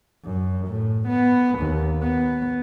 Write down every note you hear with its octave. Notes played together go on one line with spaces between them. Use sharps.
F#2
A2
B3
D#2
B3